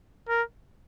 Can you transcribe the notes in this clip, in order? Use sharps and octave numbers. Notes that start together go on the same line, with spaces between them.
A#4